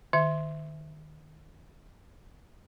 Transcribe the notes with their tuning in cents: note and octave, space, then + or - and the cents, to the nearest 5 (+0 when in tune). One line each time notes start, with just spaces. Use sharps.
D#3 -20 E5 +0